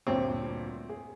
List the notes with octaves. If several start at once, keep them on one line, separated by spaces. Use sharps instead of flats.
D2 G2 A#2 C4 C#5
G#4